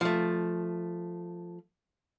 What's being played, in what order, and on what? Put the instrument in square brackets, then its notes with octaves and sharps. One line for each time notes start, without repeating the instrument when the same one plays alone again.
[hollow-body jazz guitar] F3 A3